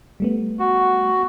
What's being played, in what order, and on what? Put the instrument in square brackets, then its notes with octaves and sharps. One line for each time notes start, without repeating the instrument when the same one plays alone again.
[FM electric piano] G3 A3 B3
[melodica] F#4